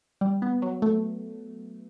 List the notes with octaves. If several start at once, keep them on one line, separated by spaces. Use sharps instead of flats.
G3
B3
F#3
A3